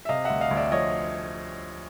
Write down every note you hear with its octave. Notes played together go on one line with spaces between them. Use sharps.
E5
C3 D#5 F5
E5 F#5
D2
D#5 F5
D2
D5 E5
F3 C#5 D#5